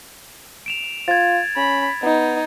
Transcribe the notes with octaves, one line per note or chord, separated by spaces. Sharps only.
D7 E7 F7
F4 G#6 A6
C#4 B5
B3 D#4